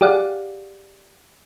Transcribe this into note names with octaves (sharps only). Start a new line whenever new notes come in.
G4 G#4 D5 F5 F#5